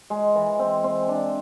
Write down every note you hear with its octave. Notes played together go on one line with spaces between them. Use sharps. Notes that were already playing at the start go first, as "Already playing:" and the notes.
G#3
E3
C4
C4
D4